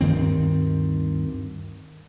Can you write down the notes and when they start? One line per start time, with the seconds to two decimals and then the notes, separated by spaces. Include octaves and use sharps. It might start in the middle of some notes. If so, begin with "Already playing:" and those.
0.01 D2 G2 D#3 C4